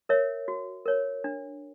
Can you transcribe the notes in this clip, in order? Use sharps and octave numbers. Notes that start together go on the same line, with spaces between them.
A#4 C#5 E5
F#4
A#4 C#5
D4